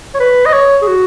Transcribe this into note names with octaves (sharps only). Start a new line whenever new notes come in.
C#5
B4
D#5
C#5
G#4
F#4